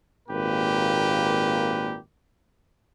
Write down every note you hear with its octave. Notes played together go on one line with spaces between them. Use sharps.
G#1 A#2 A#3 G4 B4